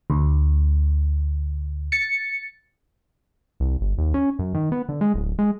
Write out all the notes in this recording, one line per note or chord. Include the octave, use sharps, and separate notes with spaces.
D2
A6 C#7
C2
G1
D#2
C#4
F#2
D#3
B3
D3
G#3
D1
G#3